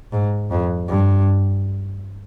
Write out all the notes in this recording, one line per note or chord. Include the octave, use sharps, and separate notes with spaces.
G#2
F2
G2